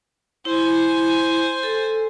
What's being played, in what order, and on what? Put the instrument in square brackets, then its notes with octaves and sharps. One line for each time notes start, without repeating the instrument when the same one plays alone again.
[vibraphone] E4 [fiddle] C5 G#5
[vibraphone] A4